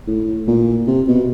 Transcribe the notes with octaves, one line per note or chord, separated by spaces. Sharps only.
A2
A#2
C3
B2